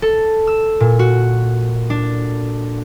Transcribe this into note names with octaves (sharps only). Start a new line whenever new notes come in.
A4
E6
A#2
F#4
D4